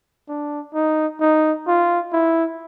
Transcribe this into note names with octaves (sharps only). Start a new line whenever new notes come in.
D4
D#4
D#4
F4
E4